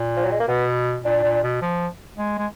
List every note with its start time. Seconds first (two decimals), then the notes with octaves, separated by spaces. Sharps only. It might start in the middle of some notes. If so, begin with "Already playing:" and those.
Already playing: A#2
0.16 F3
0.25 F#3
0.31 G#3
0.40 A#3
0.47 B2 B3
1.04 A#2 D4
1.24 A#2
1.43 B2
1.62 F3
2.18 G#3
2.38 G#3